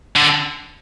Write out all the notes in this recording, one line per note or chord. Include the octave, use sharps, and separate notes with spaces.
D3